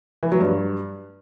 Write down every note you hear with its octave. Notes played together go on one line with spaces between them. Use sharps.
E3
F#3
G2